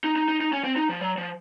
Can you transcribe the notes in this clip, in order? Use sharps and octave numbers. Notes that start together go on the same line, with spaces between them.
D#4
D#4
D#4
D#4
C#4
C4
D#4
F3
F#3
F3